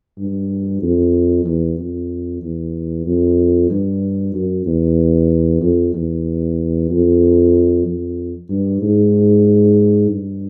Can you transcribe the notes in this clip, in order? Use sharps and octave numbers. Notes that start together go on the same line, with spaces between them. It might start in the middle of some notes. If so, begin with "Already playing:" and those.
G2
F2
E2
F2
E2
F2
G2
F#2
E2
F2
E2
F2
F2
G2
G#2
G2